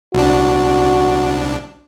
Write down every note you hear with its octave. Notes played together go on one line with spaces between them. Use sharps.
C2 D4 F#4